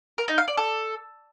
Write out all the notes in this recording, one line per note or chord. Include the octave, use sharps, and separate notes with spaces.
A#4
D#4
F5
D5
A4